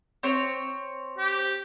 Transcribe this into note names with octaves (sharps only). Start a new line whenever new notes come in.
C4 C#5
G4